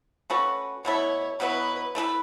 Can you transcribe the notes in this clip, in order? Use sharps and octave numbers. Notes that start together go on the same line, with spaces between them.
A3 C#4 F#4 B4
B2 A3 E4 C#5
B2 F#3 B3 E4 B4
A3 E4 G#4 B4